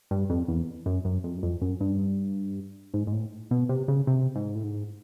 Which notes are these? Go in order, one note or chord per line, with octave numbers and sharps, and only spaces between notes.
G2
F2
E2
F#2
F#2
F2
F#2
F2
F#2
G2
G#2
G#2
A2
B2
C3
C#3
C3
G#2
A2
G#2